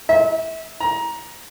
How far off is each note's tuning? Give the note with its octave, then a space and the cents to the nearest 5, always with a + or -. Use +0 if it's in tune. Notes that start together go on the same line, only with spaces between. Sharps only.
E5 -30
A#5 +20